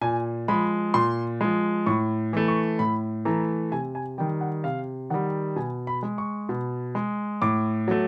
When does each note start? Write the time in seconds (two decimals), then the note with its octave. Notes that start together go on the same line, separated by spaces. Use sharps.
0.01 A#2 G#5
0.48 F3 G#3 B5
0.94 A#2 C6
1.41 F3 G#3
1.86 A2 C#6
2.33 E3 A3
2.48 C#6
2.79 A2 B5
3.25 E3 A3 A#5
3.71 C3 G#5
3.95 G#5
4.18 D#3 G3 G5
4.41 F#5
4.64 C3 F5
5.10 D#3 G3 F#5
5.56 B2 G#5
5.87 B5
6.03 G#3
6.18 C#6
6.49 B2
6.95 G#3
7.42 A2 D6
7.88 F#3 A3